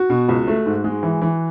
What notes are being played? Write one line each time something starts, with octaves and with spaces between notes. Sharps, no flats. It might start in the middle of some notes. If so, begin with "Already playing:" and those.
Already playing: F#4
B2
C#2
A3
G#2
G#3
E3
E3